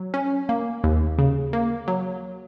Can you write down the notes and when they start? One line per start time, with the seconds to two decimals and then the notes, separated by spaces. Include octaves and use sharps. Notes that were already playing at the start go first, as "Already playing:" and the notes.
Already playing: F#3
0.14 C#4
0.49 A#3
0.84 D#2
1.19 C#3
1.53 A#3
1.88 F#3